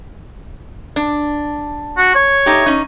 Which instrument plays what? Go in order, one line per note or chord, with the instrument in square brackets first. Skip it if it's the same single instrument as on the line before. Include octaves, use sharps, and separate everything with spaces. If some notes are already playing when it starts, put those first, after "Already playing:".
[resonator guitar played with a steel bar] D4
[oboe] F#4
C#5
[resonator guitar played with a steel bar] A3 D#4 G4
C#4 D#4